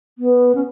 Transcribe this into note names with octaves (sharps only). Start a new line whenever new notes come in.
B3
C#4